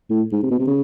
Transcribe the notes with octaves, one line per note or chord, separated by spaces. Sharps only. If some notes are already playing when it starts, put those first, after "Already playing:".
A2
G#2
C3
B2
C3
C#3